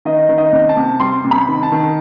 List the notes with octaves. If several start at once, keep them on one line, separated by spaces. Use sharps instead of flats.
D#3 D#5
D#3
D#5
C3
A5
C3
G3 C6
C3
B5
D#3
A5
D#3